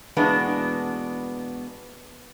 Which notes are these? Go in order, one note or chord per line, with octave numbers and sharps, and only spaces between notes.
E2 B2 G#3 A#3 B3 D4